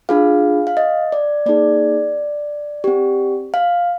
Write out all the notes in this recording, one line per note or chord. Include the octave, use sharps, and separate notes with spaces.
D4 F4 G#4 F5
F5
D#5
D5
A#3 D#4 G#4 D5
C4 G4
F5